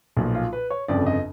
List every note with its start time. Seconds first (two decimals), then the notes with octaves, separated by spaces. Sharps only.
0.17 B1 A#2 F3
0.34 F4
0.53 B4
0.70 C#5
0.88 G1 F2 C#3 D5
1.07 D#5